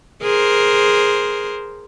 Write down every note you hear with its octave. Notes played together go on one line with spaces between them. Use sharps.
G#4 A#4 C5